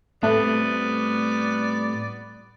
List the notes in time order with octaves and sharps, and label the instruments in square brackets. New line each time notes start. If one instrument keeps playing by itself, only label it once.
[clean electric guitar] A2 G3 C4 [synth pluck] A3 [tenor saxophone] B3 [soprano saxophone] D5